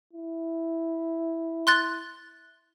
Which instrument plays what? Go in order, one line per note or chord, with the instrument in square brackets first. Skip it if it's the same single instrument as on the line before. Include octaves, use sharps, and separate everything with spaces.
[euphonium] E4
[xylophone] C6 F#6 A6